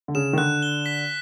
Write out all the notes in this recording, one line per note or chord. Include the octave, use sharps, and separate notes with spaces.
D3
C#3 E7
D#3
D3 F#6
G7
B6